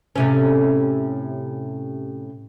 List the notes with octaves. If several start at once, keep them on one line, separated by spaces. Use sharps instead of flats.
A2 C3 C#4